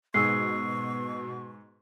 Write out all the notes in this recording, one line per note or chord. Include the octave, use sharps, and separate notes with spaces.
G#2 B2 G#4 C#6 E6 C7